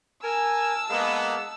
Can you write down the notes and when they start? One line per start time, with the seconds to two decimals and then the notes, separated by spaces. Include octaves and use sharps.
0.23 A#4 G#5 A5 E6
0.90 G#3 A#3 B3